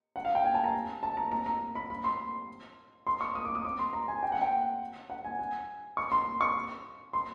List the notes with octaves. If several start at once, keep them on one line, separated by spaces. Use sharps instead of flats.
F#5
F5
G5
G#5
A5
A#5
A5
A#5
A#5
A#5
B5
B5
C6
C6
C#6
D#6
D6
D#6
D6
C6
A#5
G#5
G5
F#5
G5
F#5
G#5
G#5
C#6
C6
C#6
C6